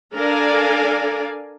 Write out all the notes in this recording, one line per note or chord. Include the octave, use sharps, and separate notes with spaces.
D4 A4 A#4 D5 F5 G#5